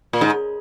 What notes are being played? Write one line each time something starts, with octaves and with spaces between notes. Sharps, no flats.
A#2
G#2